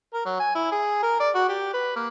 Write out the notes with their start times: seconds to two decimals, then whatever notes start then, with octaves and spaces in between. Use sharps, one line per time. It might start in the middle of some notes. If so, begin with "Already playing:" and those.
0.14 A#4
0.26 F#3
0.40 G#5
0.55 E4
0.72 G#4
1.03 A#4
1.20 D5
1.35 F#4
1.49 G4
1.74 B4
1.96 A#3